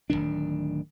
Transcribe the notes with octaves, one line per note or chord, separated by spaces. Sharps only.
D1 C2 D#3 D4